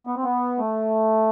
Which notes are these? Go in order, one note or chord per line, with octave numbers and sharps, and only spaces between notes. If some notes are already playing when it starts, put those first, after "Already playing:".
B3
C4
B3
A3